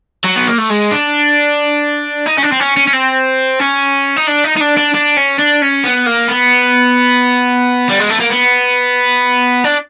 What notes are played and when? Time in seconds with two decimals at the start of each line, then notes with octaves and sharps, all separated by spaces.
0.24 F#3
0.36 B3
0.47 A#3
0.58 A3
0.70 G#3
0.91 D4
2.26 D#4
2.38 C#4
2.43 D4
2.52 C4
2.60 C#4
2.77 C#4
2.87 C#4
2.93 C4
3.60 C#4
4.16 D#4
4.27 D4
4.44 D#4
4.57 D#4
4.61 D4
4.77 D4
4.94 D4
5.17 C#4
5.39 D4
5.62 C#4
5.84 B3
6.07 A#3
6.29 B3
7.89 G3
7.99 G#3
8.10 A3
8.20 A#3
8.30 B3
9.64 D4